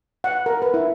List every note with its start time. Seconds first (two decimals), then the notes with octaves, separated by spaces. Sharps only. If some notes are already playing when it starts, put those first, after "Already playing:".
0.24 F#5
0.46 A#4
0.62 B4
0.74 E4